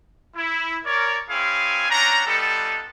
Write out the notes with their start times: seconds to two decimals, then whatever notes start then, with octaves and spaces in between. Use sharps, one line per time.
0.36 E4
0.85 A#4 C#5 D5
1.29 C4 E4 G#4 C#5 F5 G#5
1.89 C#4 D4 F#5 G5 A#5
2.26 G3 B3 D#4 F4 A4